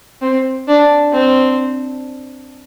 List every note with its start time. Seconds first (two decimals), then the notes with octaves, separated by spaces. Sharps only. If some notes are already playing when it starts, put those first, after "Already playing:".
0.22 C4
0.68 D4
1.12 C4